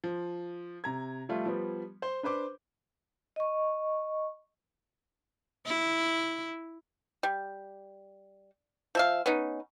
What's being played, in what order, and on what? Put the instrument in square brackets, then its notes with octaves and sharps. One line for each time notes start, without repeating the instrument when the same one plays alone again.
[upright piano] F3
C3 A#5 G#6
F3 G3 A3 F4
F3 G3 B3
C5 C6 G7
D4 B4 C5 D6
[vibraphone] D#5 C#6
[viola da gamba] E4
[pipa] G3
F3 E5 F5
B3 C#4 D#4